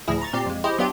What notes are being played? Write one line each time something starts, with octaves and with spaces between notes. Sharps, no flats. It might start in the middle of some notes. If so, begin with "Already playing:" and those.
D2 A2 F3 E4 G#4 A#6
A#5 C#6 A6
A#2 C4 G4 D5 C7
F2 G#3
E4 G4 G#4 C5 D#5
F#3 B3 D4 F4 G4